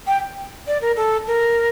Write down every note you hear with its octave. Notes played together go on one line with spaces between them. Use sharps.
G5
D5
A#4
A4
A#4